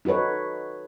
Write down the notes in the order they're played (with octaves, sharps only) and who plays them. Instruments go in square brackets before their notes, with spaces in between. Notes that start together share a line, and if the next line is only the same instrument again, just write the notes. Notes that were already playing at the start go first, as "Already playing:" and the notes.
[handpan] D#4 F#4 A4 B4 C#5